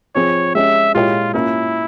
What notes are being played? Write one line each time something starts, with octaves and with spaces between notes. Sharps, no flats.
F3 C4 F4 G#4 C#5
G#3 C#4 G4 C#5 E5
A#2 G#3 E4 F4 G4 C#5
A#3 C#4 E4 F4